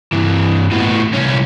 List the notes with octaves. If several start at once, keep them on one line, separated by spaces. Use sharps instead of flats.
G2 E3
A2 B3
C2 C#4